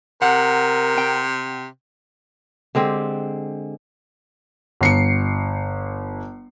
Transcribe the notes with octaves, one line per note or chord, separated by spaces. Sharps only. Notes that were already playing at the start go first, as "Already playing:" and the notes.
C3 A#4 F#5
C4 G5
D3 G#3 C4 G4
G1 C7 C#7